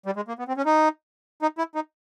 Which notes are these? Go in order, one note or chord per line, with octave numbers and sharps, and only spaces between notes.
G3
G#3
A#3
B3
C4
C#4
D#4
D#4
E4
D#4